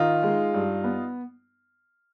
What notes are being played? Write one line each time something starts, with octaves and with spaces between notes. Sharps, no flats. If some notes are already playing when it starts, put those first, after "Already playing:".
Already playing: D#3 D#4 F4
G#3
G2
B3